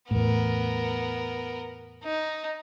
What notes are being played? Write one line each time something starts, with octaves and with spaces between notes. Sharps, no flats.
E2 A2 B3 A#4
D#4